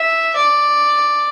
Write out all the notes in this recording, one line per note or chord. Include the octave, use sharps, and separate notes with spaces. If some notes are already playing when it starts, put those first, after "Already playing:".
Already playing: E5
D5